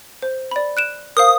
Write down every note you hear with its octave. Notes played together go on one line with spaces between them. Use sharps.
C5
D5 B5
F#6 D7 E7
A#4 C5 F5 D#6